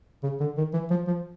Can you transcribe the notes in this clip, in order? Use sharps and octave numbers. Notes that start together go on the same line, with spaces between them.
C#3
D3
D#3
E3
F3
F3